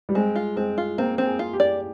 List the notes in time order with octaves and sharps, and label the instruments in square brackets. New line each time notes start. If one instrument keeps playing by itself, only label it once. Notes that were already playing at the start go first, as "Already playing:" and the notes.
[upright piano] G3
[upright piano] G#3 [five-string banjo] C4
[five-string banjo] F4
[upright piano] G#3 [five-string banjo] C4
[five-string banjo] F4
[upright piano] A#3 [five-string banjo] C4
[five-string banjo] C4
[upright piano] G#4
[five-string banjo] F4
[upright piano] G4
[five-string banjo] D5